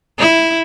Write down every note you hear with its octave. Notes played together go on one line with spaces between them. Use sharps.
E4